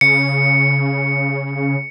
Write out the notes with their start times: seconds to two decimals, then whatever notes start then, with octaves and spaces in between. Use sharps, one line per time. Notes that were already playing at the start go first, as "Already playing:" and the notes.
0.01 C#3 C#7